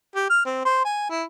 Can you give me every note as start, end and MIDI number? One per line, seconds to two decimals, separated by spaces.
0.16 0.26 67
0.30 0.42 89
0.45 0.60 60
0.65 0.82 72
0.85 1.07 80
1.10 1.23 64